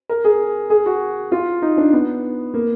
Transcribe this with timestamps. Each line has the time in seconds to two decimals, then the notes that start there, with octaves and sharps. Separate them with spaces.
0.09 A#4
0.25 G#4
0.70 G#4
0.86 F#4
1.32 F4
1.62 D#4
1.77 D4
1.93 B3
2.54 A#3